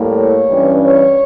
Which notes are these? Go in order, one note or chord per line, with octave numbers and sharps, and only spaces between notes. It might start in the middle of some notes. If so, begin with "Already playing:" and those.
Already playing: A2 G3 A#3
C#5
G2 E3 G3 C#4
C#5